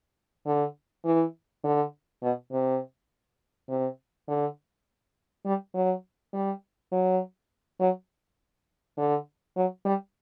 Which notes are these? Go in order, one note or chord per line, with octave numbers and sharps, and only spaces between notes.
D3
E3
D3
B2
C3
C3
D3
G3
F#3
G3
F#3
F#3
D3
F#3
G3